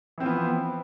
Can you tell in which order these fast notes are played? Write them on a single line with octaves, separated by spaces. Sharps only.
E3 C4 F3 B3